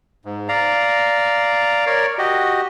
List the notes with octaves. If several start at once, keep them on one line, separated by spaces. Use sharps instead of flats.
G#2
D5 F5 A#5
A#4 C#5 D5
F#4 G4 D#5